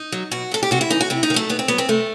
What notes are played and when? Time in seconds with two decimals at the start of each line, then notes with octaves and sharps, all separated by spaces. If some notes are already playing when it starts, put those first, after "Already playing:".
Already playing: D#4
0.12 F#3
0.31 B2 F#4
0.51 F#3 A4
0.63 G4
0.71 C3 F#4
0.81 E4
0.90 E3 D#4
1.01 F#4
1.10 C3 E4
1.23 D#4
1.30 D#3
1.34 F#3 A3
1.49 B2 B3
1.59 C4
1.68 F#3 B3
1.78 C4
1.88 C3 A3